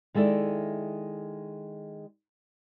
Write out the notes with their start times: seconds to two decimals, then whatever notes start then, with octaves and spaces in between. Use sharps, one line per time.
0.14 D#3 G#3 E4 A4 D5